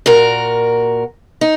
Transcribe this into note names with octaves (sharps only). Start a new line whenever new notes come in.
A#2 F#4 A#4
D#4